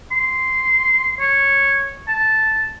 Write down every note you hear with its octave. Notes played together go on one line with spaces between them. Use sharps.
C6
C#5
A5